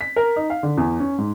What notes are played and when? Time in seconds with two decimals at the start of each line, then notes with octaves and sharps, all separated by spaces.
0.01 B6
0.16 A#4
0.36 D#4
0.50 F5
0.63 D3
0.77 E2
1.00 C#4
1.18 G#2